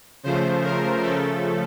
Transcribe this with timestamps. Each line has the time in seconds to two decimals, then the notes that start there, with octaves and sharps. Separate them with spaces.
0.23 C#3 F3 A3 C5
0.63 A#4
1.02 C#3 F3 A3 A4